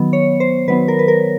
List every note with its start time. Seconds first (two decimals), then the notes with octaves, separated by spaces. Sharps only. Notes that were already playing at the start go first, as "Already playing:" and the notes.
Already playing: D#3 F#3 B3
0.13 C#5
0.40 C5
0.68 D#3 F#3 B3 B4
0.88 A#4
0.99 B4
1.08 A#4